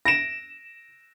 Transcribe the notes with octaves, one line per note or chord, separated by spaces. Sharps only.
A#6 D7 E7